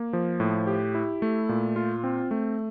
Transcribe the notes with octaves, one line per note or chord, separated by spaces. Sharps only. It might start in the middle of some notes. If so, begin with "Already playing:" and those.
Already playing: A#3
F3
A2
G4
E4
A3
A#2
F4
C4
A3